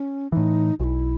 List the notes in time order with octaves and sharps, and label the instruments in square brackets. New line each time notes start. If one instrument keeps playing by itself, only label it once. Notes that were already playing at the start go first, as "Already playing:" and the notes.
Already playing: [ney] C#4
[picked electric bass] A2 E3 [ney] D#4
[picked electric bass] B1 [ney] F#4
[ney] E4